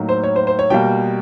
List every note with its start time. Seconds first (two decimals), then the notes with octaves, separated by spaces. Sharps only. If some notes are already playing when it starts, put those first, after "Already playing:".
Already playing: A2 F#3 A#3 D#4
0.09 C5
0.24 C#5
0.36 C5
0.47 C5
0.59 C#5
0.70 B2 G3 A#3 G5